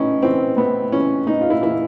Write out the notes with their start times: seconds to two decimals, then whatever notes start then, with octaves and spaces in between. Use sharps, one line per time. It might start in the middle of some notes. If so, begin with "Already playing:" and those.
Already playing: A2 E3 C#4 D#4 E4
0.22 E3 C4
0.57 A2 B3
0.92 E3 C#4
1.27 A2 D#4
1.41 F4
1.50 E4
1.61 E3 E4